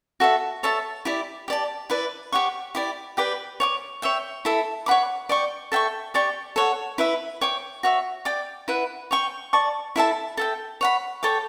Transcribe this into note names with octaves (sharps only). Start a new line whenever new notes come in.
F#4 A4 E5
A4 C#5 E5 A5
E4 G4 D5
G4 D5 A5
E4 B4 D5
G4 C#5 F#5 C#6
E4 G4 D5
G4 B4 D5 G5
C#5 G5 D6
C#5 E5 G5
E4 A4 E5
C#5 F#5 B5 D6
D5 G5 C#6
A4 E5 G5 C#6
G4 D5 G5 C#6
A4 C#5 F#5
E4 B4 E5
C#5 G5 D6
F#4 C#5 E5
D5 G5 D6
E4 B4 F#5
C#5 G5 C#6
D5 A5 C#6
E4 A4 E5 A5
A4 E5 G5
C#5 F#5 B5
A4 C#5 G5 D6